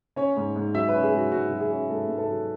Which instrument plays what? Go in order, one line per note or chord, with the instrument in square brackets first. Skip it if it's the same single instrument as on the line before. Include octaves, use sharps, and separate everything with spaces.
[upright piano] C#4 C#5
G#2
G#2
F#3 E5
B4
C#4
G#4
G#2 F#4
G#2 F#4
F#3
G#4
C#4
G#2 A4
G#2
A4
F#3